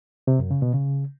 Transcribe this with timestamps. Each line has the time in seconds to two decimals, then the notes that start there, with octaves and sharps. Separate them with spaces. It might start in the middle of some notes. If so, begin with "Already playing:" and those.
0.27 C3
0.39 F#2
0.51 C#3
0.62 B2
0.74 C#3